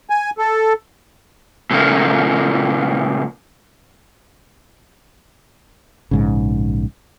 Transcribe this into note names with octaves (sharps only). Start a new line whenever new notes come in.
G#5
A4
A#2 C#3 F3 A3 A#3
A#1 G#2 C#3